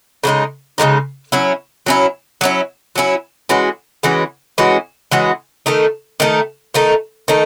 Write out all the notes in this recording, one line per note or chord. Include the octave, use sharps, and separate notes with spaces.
C#3 E3 G#3 D#4
C#3 E3 G#3 D#4
F#3 C#4 E4
F#3 C#4 E4
F#3 C#4 E4
F#3 C#4 E4
E3 G#3 C#4 F#4
E3 G#3 C#4 F#4
E3 G#3 C#4 F#4
E3 G#3 C#4 F#4
D#3 A3 D#4
D#3 A3 D#4
D#3 A3 D#4
D#3 A3 D#4